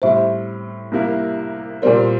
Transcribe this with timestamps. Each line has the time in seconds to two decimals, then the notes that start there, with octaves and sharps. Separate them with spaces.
0.02 A2 G3 C4 C5 E5
0.92 C2 C3 G3 A#3 E4
1.82 A#2 G3 C4 A#4 D5